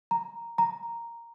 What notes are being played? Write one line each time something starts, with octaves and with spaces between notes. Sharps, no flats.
A#5
A#5